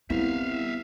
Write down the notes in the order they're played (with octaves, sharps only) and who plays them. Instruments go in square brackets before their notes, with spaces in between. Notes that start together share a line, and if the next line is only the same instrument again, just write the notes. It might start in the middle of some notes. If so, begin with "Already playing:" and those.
[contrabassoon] C2 [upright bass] B3 [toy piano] E4 [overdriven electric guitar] E5 F5